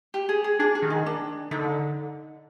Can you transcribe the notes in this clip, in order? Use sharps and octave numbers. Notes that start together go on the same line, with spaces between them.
G4
G#4
G#4
D4 G#4
G#4
D#3
D#4
D4
D3 D#4